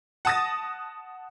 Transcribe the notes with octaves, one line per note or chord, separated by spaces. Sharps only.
F#5 A5 D#6 A6 A#6